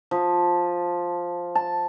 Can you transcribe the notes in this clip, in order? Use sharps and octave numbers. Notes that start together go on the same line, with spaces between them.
F3
A5